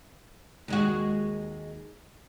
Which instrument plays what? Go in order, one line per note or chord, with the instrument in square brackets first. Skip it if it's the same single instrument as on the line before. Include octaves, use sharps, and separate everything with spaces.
[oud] D#2 G#3 F#4